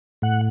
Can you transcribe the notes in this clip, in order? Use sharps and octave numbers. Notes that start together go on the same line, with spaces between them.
A2 F#5